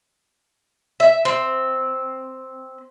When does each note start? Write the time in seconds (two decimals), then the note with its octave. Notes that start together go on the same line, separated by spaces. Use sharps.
1.00 E5
1.25 C4